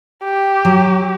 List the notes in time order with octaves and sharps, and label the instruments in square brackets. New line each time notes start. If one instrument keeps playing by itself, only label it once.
[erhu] G4
[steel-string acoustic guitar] F#3